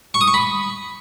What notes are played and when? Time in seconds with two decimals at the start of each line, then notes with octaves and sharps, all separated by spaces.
0.14 C#6
0.21 D#6
0.27 C#6
0.34 B5